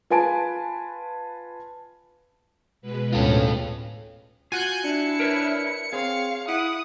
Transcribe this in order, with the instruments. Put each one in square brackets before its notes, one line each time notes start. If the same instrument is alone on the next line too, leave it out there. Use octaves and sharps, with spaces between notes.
[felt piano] F4 B4 G#5 A5 D7
[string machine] B2 G#3 B4
[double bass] D2 A2 [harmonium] C#4 [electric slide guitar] F4 A4
[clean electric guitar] F4 F#4 F#5 [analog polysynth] G#5 F#6 G6
[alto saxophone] D4 [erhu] E4 [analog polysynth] C#7
[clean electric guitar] A#4 B4 C#5
[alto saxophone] C4 [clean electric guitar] G#4 C#5 [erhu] F5
[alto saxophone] E4 [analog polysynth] F#5 [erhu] D#6